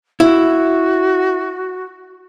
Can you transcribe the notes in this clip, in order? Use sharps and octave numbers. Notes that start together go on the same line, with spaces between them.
E4 F#4